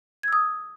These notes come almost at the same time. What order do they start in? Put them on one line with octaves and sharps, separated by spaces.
G#6 E6 D#6